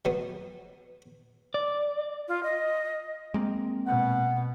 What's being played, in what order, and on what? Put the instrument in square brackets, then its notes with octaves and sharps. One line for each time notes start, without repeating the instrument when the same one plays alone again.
[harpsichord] B2 F#3 B3
[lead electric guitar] D5
[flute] F4
D#5
[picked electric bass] G#3 A#3 C4
[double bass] B2 [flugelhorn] F#5